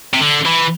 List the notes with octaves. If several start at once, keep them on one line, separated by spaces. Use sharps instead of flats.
C3
D3
E3